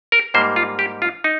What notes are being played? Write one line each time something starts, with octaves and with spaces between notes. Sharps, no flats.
A#4
G#2 G3 A#3 C5
F4
G4
F4
D#4